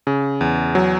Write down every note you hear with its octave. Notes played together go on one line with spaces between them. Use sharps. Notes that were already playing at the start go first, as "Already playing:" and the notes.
C#3
E2
F#3